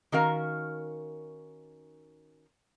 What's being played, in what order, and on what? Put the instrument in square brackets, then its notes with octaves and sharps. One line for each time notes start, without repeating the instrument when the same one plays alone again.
[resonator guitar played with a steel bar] D#3 C#4 F#4 A#4 F5